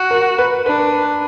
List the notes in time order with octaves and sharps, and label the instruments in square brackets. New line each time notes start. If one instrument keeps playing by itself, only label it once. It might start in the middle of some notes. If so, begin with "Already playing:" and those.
Already playing: [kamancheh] F#4
[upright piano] A#4
B4
[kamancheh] D4 [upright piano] B4